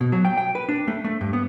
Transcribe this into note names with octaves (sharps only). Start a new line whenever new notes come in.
B2
F#3
G5
G5
B4
D4
A3
A3
G2
B3